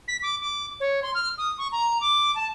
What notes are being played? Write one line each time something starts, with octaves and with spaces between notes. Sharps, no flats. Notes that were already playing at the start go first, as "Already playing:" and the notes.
B6
D6
D6
C#5
C6
F6
D#6
C#6
A#5
D6
A5